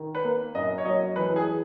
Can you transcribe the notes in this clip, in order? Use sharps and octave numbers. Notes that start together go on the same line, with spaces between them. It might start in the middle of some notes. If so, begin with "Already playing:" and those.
Already playing: D#3
B4
A#3
F#2 D#5
C#5
F#3 D#5
E3 B4
G#4